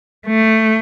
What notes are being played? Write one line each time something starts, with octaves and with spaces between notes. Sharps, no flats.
A3